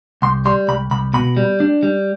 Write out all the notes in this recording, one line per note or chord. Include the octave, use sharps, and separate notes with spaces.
C2 C6
G3 C6
C2 B5
C2 B5
B2 B5
G3
D4
G3